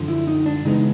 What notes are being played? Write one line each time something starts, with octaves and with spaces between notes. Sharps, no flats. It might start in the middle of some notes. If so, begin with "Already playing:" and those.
Already playing: F#2 D3 F3
E4
D#4
D4
C#3 E3 G#3 B3 D4 D#4